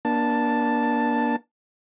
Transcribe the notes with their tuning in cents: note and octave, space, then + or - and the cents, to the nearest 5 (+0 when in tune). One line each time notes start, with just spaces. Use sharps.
A#3 +35 D4 +0 A5 +0